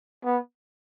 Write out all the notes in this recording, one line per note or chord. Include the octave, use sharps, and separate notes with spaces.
B3